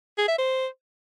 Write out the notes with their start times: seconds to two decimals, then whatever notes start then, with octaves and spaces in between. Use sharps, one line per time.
0.18 G#4
0.28 E5
0.38 C5